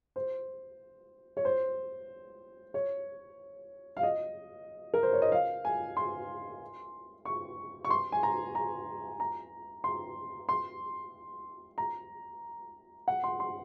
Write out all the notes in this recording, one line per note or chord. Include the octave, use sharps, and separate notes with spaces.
C5
C#5
C5
C#5
F5
D#5
A#4
C5
C#5
D#5
F5
G#5
C6
C#6
C#6
C6
G#5
A#5
A#5
A#5
C6
C6
A#5
F#5
C6
C6